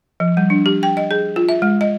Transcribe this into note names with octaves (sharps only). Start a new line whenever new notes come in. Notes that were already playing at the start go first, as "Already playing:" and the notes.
F3
G3
D4
G4
G5
D#5
G#4
F4
E5
G#3
D#5